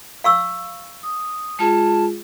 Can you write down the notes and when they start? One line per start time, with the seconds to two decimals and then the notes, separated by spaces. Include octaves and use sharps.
0.24 F5 C#6 E6
1.03 D#6
1.59 G#3 F4 G#4 A5